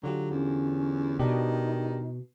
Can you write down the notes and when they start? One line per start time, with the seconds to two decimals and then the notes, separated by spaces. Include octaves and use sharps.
0.04 D3 F#3 F4 G4
0.31 E2 C#4
1.19 B2 D#3 D4 D#4 G4